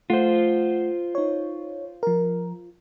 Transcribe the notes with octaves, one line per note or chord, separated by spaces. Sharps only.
A3 F4 C5 F#5
D#4 C#5
F3 A#4